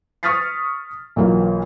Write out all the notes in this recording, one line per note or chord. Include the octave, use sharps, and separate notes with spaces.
C#6 D#6 F6 A6 B6 C7
B1 E3 A#3 F4